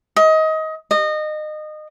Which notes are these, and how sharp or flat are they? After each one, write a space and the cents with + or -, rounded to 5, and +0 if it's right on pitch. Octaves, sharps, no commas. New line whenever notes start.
D#5 +25
D#5 -25